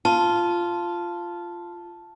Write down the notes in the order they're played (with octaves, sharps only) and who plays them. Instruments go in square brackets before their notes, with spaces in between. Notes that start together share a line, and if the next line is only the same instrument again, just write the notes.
[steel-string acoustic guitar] F4 [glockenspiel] A5